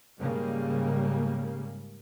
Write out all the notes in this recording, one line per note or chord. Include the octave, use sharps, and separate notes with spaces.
G#2 C#3 G3 A#3